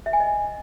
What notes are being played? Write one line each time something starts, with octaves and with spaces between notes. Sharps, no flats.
E5
G#5
D#5